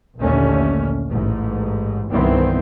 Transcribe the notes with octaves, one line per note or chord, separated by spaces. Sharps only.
A#1 D#2 D3 A3 C#4
A1 G#2
C2 G2 D#3 E3 B3 C4